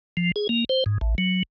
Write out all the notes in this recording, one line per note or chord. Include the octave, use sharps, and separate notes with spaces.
F3
G#4
A#3
C5
G#2
A1
F#3